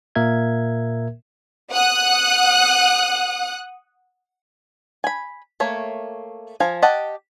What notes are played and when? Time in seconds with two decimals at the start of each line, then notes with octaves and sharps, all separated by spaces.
0.15 A#2 A#3 A#4 E5 G#6
1.71 F#5 D#6 F#6
5.04 G#5 B5
5.60 A3 A#3 C#5
6.60 F3 F5 G#5
6.82 G4 D#5 F#5 A5